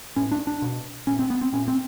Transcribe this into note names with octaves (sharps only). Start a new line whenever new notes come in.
A2 C#4
D4
D4
B2
A#2 C#4
C4
B3
C4
A#2 C#4
C4